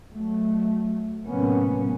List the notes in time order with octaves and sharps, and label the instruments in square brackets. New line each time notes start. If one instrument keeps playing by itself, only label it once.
[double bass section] F#3 A3
A2 C3 F#3 A#3 B3 C#4